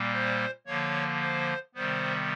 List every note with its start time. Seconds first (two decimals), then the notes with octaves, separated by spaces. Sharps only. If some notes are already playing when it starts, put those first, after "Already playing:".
Already playing: A#2 G3 A#3
0.13 C5
0.66 D3 F3 A#3 C#5
1.21 C5
1.75 C3 D#3 G3 B3 C5